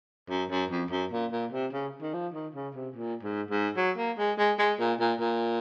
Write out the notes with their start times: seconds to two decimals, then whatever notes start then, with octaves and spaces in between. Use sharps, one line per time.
0.30 F#2
0.51 F#2
0.70 F2
0.91 F#2
1.12 A#2
1.32 A#2
1.52 C3
1.72 C#3
2.01 D#3
2.14 F3
2.34 D#3
2.54 C#3
2.75 C3
2.96 A#2
3.23 G#2
3.50 G#2
3.76 F#3
3.97 A#3
4.18 G#3
4.38 G#3
4.58 G#3
4.79 A#2
5.00 A#2
5.20 A#2